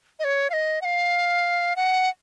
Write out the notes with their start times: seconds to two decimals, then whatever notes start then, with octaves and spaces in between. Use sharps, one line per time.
0.19 D#5
0.24 C#5
0.50 F5
0.53 D#5
0.82 F#5
0.85 F5
1.76 F#5